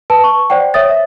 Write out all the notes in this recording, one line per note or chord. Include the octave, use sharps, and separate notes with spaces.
B4 A5
C#6
C5 D5 F#5 G5
C#5 E5 D#6 A6
E5